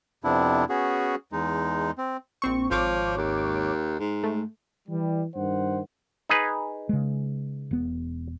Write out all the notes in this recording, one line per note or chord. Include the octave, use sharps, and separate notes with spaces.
F2 C3 B3 D4 E4
B3 C#4 F#4 G#4
E2 G#3 D#4
C4
A#1 C4 C#6
G#1 F3 C#5 D6
D#2
G#2
A3
E3 G3
G2 D#3 C5 F#5
D#4 G#4 B4
C#3 G#3
E1 B3